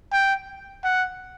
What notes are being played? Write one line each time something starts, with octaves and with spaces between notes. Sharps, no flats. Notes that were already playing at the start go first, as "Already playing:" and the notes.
G5
F#5